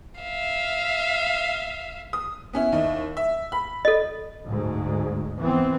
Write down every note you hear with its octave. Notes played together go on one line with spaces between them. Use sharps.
E5 F5
D#6
B3 C#4 E4
D#2 D#4 E4
E5
B5
A4 D#5
D2 G#2
E3 B3 C4